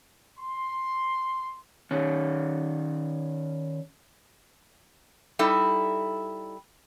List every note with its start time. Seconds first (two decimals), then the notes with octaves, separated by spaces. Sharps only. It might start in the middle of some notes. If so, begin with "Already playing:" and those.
0.40 C6
1.91 D#3 C#4
5.39 G3 D#4 E4 A4